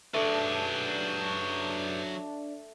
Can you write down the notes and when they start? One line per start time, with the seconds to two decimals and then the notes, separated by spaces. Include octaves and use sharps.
0.14 F#3 A3 D4 G#4 B4 D5